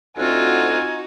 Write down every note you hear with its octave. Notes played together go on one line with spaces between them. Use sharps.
D2 C4 D#4 F4 F#4 F#5 G#5